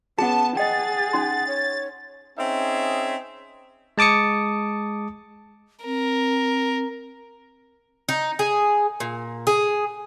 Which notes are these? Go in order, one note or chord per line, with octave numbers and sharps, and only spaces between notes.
B3 C#4 G#4 F#5 A5
G#4 D#5 F#5 G5 A6
C#4 D#4 C6
C#5
C4 C#4 D#4 G#4 E5
G#3 A5 D6 D#6 C#7
C4 A#4
D#4
G#4
A#2
G#4